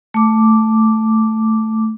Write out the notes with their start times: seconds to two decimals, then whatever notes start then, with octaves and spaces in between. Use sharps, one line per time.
0.14 A3 D6